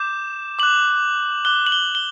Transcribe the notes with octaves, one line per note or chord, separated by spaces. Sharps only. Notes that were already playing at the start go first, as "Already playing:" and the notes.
Already playing: D6 G6 E7
D6 F#6 F#7
D6 F#6 G7
F#7
G7
G7